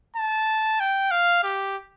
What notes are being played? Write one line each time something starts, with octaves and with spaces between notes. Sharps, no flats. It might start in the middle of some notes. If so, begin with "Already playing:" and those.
A5
G5
F5
G4